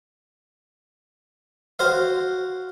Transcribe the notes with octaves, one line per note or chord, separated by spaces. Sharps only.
F#4 C5 F5